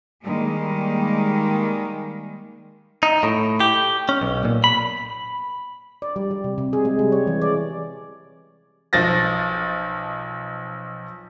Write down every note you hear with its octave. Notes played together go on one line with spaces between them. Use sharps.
D#3 G3 G#3 A#3
D#4
A2
G4
C#4
B1
A#2
B5
D5
G3
G3
C3
C3
G#4
G#3
G3
C#5
E3
D5
B1 F3 A6 A#6